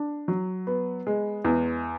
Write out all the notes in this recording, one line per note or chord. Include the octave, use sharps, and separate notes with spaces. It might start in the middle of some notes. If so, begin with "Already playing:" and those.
Already playing: D4
F#3
B3
G#3
E2